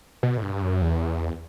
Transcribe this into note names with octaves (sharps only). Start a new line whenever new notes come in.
B2
A2
G2
F#2
E2